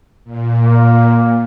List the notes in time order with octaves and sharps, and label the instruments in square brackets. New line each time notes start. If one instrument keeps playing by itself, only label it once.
[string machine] A#2
[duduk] A#3